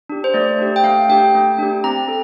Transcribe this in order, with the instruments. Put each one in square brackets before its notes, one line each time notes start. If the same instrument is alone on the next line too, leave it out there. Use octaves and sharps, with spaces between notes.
[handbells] D4 G4
C5
A3 D5
D4 G4
G5
A3 F5
D4 G4 G5
A3
D4 G4
C4 A#5
A4